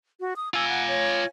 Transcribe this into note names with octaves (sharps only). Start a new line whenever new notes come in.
F#4
D#6
F4 G#5 E6
F#5
C#5